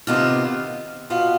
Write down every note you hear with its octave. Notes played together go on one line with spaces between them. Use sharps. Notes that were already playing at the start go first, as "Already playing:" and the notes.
C3 D#3 B3 F4
B2 B3 F4